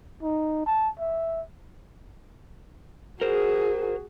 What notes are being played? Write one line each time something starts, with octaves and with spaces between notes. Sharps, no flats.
D#4
A5
E5
F#4 G#4 A#4 C5